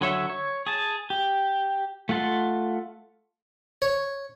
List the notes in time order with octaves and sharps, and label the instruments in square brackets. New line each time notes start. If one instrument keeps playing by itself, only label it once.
[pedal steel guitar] D3 F#3 C#5 E5
C#5
G#4 A5
G4
A3 F4 F#5 A5 C6
[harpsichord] C#5